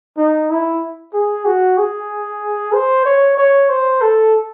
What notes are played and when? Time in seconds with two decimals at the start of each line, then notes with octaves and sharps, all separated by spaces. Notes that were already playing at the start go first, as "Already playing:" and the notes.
0.17 D#4
0.50 E4
1.14 G#4
1.46 F#4
1.78 G#4
2.74 C5
3.05 C#5
3.37 C#5
3.69 C5
4.01 A4